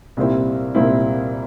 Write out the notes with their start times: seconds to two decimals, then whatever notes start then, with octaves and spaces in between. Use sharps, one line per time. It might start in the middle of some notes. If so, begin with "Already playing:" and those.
0.17 C2 A#2 G3 C4 E4
0.75 C2 A#2 G3 C4 E4